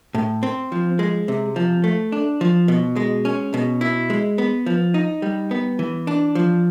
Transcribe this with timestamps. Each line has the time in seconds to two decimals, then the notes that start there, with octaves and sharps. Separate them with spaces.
0.14 A2
0.43 C4
0.72 F3
0.99 G#3
1.28 C3
1.56 F3
1.84 A3
2.12 D4
2.41 F3
2.68 B2
2.96 G#3
3.25 C#4
3.54 B2
3.81 E4
4.10 G#3
4.38 B3
4.66 F3
4.94 D#4
5.22 G3
5.51 B3
5.79 E3
6.07 D4
6.35 F3